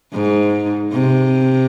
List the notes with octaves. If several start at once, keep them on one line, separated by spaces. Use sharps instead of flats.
G#2
C3